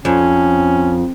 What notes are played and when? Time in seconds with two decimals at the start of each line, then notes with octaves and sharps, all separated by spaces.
0.05 F2 C#4